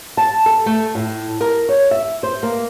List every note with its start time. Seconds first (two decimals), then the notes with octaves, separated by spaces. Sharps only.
0.17 A5
0.46 A4
0.66 A3
0.95 A2
1.41 A#4
1.69 C#5
1.91 E5
2.23 C5
2.43 A#3